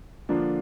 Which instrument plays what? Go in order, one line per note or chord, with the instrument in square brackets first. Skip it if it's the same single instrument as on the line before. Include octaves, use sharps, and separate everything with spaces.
[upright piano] D3 F3 A#3 D4 F4